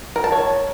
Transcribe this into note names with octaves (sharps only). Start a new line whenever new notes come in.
A#4
A5
C#5